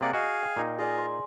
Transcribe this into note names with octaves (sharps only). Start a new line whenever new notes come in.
C3 A#3 G#4 D5 F#5
F#4 G#4 D#5 F5 G#5
G5
A#2 D#4
F4 G#4 D5 D#5 G#5
C5